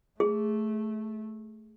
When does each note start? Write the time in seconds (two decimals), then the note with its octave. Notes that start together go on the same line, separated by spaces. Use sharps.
0.20 A3 G#4